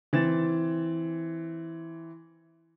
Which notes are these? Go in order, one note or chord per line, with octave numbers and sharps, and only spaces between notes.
E3 C4 A6 E7